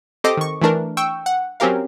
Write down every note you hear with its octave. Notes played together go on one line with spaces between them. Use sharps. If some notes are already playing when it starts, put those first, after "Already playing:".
C4 G4 A4 C5 D#5 D6
D#3 C#6
E3 A3 D4 A#4
G5 C#6 E6
F#5
F#3 C4 C#4 G4 A#4 F5